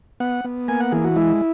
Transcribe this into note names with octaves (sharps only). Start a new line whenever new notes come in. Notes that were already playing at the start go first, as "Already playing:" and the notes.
B3 F#5
B3
A#3 G#5
F#5
E3 G#4
F#4
G#3 E4